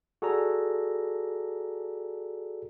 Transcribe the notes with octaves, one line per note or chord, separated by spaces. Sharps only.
F#4 G#4 A4 D5 A#5